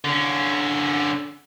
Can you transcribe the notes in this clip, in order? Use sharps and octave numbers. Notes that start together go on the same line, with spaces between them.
D3 C#4